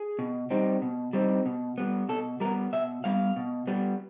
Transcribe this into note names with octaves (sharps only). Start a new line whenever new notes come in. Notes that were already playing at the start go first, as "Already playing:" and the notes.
Already playing: G#4
B2
G3 C4 D#4
B2
G3 C4 D#4
B2
G3 B3
B2 A4
G3 B3 A#4
B2 E5
G3 B3 F5
B2
G3 B3